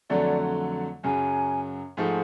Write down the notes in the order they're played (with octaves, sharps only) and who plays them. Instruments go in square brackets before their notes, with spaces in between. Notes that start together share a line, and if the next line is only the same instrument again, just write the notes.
[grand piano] F2 D3 F#3 A3 [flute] D5
[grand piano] F#2 C#3 F#3 [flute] G#5
[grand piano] G#2 F3 A3